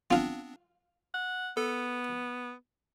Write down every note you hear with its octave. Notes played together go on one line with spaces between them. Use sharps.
B3 C4 D4 F4 F5
F#5
B3 A4